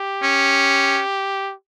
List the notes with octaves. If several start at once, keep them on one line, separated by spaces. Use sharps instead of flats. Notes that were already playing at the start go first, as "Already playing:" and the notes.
Already playing: G4
C#4